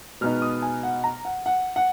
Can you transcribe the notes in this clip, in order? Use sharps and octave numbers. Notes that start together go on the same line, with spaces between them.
B2 G#3 B3 D#4 F6
D#6
G#5
F#5
A#5
F#5
F#5
F#5